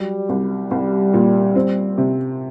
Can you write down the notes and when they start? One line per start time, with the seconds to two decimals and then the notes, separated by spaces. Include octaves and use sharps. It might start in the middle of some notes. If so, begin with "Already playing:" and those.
Already playing: F#3 G3
0.29 C2
0.71 C2
1.14 A#2
1.55 C4
1.98 C3